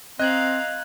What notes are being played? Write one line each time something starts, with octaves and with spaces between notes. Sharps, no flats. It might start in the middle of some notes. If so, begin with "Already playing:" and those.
C4 D#5 F5 A#5 F#6 G#6 F#7